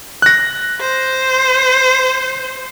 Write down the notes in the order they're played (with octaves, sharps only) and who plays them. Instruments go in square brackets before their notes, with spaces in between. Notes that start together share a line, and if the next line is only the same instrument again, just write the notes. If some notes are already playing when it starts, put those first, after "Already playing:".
[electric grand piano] F#6 A#6
[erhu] C5